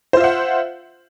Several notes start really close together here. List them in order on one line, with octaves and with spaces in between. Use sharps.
C5 F4 E5 F#5